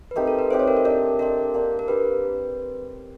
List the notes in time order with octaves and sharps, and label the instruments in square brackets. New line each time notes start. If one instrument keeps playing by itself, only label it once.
[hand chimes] B4
[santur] A3 C4 D#4 G4 [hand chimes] A#4
[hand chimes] A4
B4
[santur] A3 C4 D#4 G4 [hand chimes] C5
[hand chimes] C#5
A#4
A4
[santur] D4 G4 C5 D#5 [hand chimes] A#4
[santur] D4 G4 C5 D#5 [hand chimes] A#4
[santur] A#3 D4 G4
[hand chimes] A#4
[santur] A#3 D4 G4 [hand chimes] B4